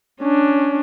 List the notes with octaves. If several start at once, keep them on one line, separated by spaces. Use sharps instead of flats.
C#4 D4